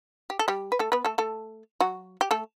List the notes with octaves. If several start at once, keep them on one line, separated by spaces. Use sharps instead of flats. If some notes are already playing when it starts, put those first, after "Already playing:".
G4
A4
G3 G4
B4
A3 A4
B3 B4
A3 A4
A3 A4
F#3 F#4
G4
A3 A4